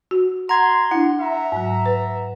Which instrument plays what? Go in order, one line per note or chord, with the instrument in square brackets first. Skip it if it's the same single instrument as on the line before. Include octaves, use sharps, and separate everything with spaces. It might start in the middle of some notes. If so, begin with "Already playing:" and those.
[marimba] F#4
[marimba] F#5 [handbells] A#5 G#6 [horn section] C6
[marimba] D4 E4 [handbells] F#5
[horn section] E5 A#5
[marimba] G#2 F#3
B4